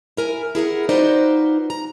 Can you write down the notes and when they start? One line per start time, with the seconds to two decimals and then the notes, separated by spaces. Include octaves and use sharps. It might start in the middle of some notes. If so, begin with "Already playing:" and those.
0.17 E4 A#4 G#5
0.55 E4 G#4 A#4 F#5
0.89 D#4 F4 F#4 B4 C5 D5
1.70 A#5